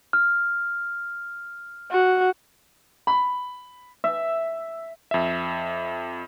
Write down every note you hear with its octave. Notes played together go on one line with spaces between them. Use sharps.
F6
F#4
B5
E5
F2 E5